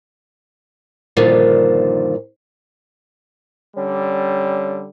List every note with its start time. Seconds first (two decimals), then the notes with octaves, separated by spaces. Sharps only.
1.17 G2 A#2 D3 D#3 F3
3.77 D3 G3 C#4